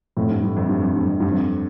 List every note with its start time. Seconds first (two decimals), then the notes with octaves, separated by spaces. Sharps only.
0.17 F2 A2
0.30 G2
0.43 G2
0.57 F2
0.69 G2
0.82 F2
0.95 G2
1.07 F2
1.20 G2
1.32 F2